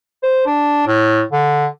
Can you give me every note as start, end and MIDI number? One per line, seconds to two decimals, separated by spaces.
0.23 0.45 72
0.46 0.85 62
0.87 1.23 45
1.32 1.66 50